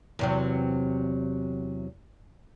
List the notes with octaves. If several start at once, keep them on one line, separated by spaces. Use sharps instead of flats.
E2 C3 F#3